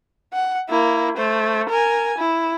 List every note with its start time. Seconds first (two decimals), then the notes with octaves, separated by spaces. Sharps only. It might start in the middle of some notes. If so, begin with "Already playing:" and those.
0.33 F#5
0.69 A#3 E4
1.17 A3 C5
1.69 A#4 G#5
2.18 E4